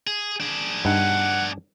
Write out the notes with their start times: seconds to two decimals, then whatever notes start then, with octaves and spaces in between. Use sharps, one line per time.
0.07 G#4
0.40 D4 G#4
0.85 G2 D#4 F#5 A5